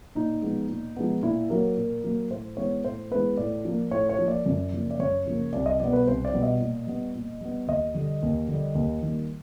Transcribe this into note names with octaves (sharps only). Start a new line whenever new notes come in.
A#2 D#4
F3 G#3 B3
A#2
F3 G#3 B3
A#2 E4
F#3 A#3 A#4
A#2
F#3 A#3
A2 C5
E3 G#3 B3 C#5
A2 C5
E3 G#3 B3 B4
A2 D5
F3 A#3
A2 C#5
C#5
F3 A#3
D5
F#2
C#3 F3 A#3
D5
F#2 C#5
C#3 F3 A#3
C2 D5
D#5
B2 G3 B3 D5
B4
C2 C5
D5
B2 G3 B3
D#5
A#2
G3 B3
A#2
G3 B3
D#2 D#5
D3 G3
D#2
D3
G3
D#2
D#3 G3 A#3